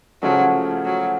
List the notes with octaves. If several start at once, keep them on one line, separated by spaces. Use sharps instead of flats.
C#3 F3 F#3 A3
F#3